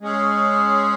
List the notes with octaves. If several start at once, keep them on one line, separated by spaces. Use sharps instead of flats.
G#3 C#4 G#4